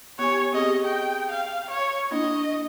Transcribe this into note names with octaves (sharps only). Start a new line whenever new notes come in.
B3 G4 C#5 G#5
C4 G4 G#4 D#5
G5
F5
C#5
A#3 D4 E4 D#5